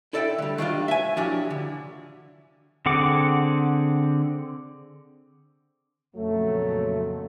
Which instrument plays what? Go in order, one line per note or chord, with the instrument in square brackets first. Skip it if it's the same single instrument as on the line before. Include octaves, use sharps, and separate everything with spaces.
[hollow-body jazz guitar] E4 A4 D5 E5 F5 G5
D3 G3
D#3 G3 D4 F4
E5 G#5
F3 F#3 D4 E4 G4
D3
[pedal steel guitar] D3 C4 G#4 F#5 D6
[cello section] F2 A#2 C#3 [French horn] F#3 [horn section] A3